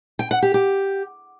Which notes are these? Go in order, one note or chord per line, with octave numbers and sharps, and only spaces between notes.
G5
F#5
G4
G4